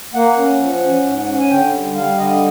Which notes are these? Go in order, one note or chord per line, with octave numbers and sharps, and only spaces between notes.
A#3 F#5
C#4
F3
C#4
G#2
C#4
G#5
D3 G5
G3
G3 F5
D3 D#5